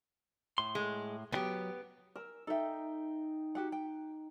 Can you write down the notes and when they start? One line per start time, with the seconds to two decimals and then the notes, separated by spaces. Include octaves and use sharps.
0.58 A2 C6
0.75 G#3
1.32 C#2 F#3 B3 G4
2.16 A#4 E6
2.47 D#4 A4 E5 G5
3.55 F#4 G4 F#5
3.72 G5